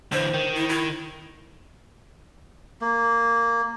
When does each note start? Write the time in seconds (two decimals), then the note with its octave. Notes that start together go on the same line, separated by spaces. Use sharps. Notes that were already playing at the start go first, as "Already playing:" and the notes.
0.12 D3 E3 C5
0.34 D#3
0.55 E4
0.69 E4
2.81 A#3